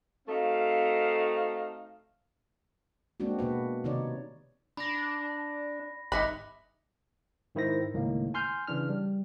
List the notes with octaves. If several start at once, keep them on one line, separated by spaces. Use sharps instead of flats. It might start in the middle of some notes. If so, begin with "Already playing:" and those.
A3 C4 D#4 F#4 F5
G#3 A#3 C4 D4 F#4
B2 A#3 F#4 B4
C3 D#3 D#4 C#5 D5
D4 B5 A#6
G1 D#4 E5 B5 D6 F#6 A#6
G#2 D#3 E4 C5 A#6
C#2 A2 D#3 A#3
G#5 C6 F6 G6
C#3 E3 D4 F6
G3